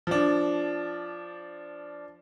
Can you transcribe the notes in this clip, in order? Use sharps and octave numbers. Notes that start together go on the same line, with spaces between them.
F3 D4